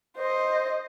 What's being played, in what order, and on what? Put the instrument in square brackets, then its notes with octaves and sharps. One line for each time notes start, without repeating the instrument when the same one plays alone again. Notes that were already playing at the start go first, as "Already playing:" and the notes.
[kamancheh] C5 D#5